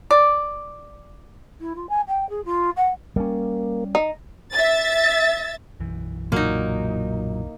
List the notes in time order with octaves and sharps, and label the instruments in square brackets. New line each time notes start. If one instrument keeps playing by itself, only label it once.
[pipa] D5
[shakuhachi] E4
F4
G#5
G5
G#4
F4
F#5
[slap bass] G3 C#4 [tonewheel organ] A#3
[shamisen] D#4
[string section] E5 A6
[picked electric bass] B1 F#2 E3
[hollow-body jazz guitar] A#2 F#3 [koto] A#3 D#4